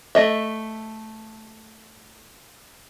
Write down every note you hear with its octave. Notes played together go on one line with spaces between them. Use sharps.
A3 D#5 E5